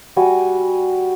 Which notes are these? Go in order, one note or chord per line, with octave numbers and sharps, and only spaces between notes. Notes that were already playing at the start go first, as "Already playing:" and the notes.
G3 F#4 G#5